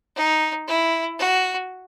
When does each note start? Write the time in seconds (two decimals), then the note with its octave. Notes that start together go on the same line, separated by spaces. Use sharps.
0.16 D#4
0.68 E4
1.19 F#4